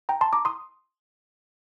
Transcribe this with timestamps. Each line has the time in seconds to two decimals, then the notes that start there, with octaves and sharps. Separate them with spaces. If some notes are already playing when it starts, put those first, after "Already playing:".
0.09 G5 A#5
0.21 A5 C6
0.33 A#5 D6
0.45 C6 D#6